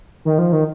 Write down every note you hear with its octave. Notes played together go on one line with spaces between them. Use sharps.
D#3
F3
D#3